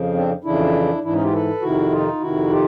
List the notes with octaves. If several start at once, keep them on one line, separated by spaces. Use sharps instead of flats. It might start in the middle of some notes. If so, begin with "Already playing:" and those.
Already playing: F2 C#3 F3
C4 D4
F2 C#3 E3 D4 E4
G#2 E3 D4 E4
C#4 D#4
F4 G4
A4 B4
F2 C3 D#3 E4 F#4
D#4 F4
F2 C3 D#3 E4 F#4
F4 G4